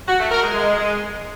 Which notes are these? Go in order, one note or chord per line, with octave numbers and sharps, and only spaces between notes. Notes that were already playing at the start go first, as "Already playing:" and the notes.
F#4
A3
A#4
G#3
G#3